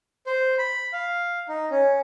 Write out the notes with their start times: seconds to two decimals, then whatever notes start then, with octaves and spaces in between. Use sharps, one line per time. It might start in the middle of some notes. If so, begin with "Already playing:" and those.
0.27 C5
0.58 B5
0.93 F5
1.48 D#4
1.71 C#4